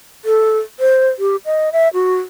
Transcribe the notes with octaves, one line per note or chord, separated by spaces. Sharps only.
A4
C5
G4
D#5
E5
F#4